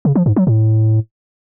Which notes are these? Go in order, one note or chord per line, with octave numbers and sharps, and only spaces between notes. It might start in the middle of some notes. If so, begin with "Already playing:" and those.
C#3
F3
G#2
F#3
A2